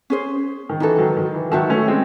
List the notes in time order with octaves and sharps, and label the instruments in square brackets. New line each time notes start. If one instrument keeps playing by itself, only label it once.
[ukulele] C#4 G#4 C5
[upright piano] D#3
[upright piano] E3 [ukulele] D#4 F#4 A4
[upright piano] D#3 F#3
D#3
E3
[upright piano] D#3 F#3 [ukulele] F#4 C5 E5 A5
[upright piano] A3 C#4
G#3 C4